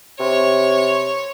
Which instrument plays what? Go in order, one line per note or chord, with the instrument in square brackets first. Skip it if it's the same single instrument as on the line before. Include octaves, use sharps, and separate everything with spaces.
[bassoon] C3 [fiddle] C#5